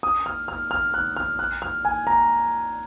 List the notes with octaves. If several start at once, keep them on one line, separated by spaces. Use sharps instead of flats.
D#6
F6
F6
F6
F#6
F6
F#6
F6
G#5
A#5